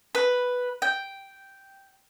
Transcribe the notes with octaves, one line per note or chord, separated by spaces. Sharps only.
B4
G5